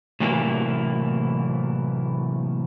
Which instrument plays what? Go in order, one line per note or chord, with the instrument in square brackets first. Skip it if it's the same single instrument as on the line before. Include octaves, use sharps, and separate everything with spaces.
[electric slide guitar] A2 C3 E3 F#3 A#3 E4